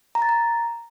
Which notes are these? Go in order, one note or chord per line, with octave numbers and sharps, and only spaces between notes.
A#5
A6
A#5